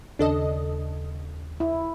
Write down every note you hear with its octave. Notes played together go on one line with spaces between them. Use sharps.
D#2 C#3 D4 A4 D#5
E4